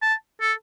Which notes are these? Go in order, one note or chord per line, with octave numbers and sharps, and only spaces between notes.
A5
A4